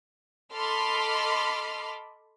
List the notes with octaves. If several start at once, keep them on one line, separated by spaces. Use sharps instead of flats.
A4 D#5 B5 C6 D6 F6